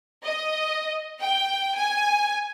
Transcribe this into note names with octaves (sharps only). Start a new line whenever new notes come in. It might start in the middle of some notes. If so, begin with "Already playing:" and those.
D#5
G5
G#5